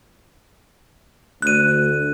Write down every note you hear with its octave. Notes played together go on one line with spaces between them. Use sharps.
D2 F#6 D#7